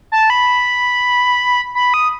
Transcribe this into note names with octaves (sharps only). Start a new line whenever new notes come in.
A5
B5
B5
D#6